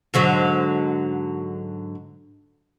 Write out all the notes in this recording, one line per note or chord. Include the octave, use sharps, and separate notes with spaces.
G#2 D3 F#3